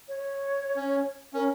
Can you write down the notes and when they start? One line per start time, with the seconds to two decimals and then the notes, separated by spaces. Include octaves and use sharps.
0.09 C#5
0.76 C#4
1.33 C#4 A#4